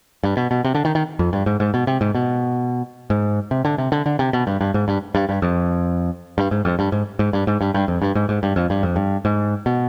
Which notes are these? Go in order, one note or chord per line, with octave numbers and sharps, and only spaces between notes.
G2
B2
B2
C3
D3
D#3
D#3
F2
G2
G#2
G#2
B2
C3
G#2
B2
G#2
C3
D3
C3
D3
D3
C3
B2
G2
G2
G#2
G2
G2
G2
F2
G2
G#2
F2
G2
G#2
G#2
G2
G#2
G2
G2
F2
G2
G#2
G#2
G2
F2
G2
F2
G2
G#2
B2